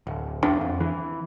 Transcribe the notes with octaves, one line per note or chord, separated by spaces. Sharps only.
D1
E2 D4
F2
E3